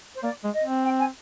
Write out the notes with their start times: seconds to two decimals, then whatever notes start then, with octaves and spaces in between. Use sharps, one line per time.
0.15 C5
0.23 A#3 D5
0.44 G#3
0.54 D#5
0.64 C4
0.85 G5
1.00 G#5